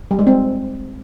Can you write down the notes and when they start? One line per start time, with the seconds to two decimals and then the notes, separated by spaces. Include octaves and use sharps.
0.11 G3
0.19 G#3
0.27 C4